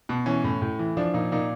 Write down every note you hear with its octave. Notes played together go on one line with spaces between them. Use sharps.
B2
E3 C#4
A2
A2
E3
F3 D4
A#2 D#4
A#2 D#4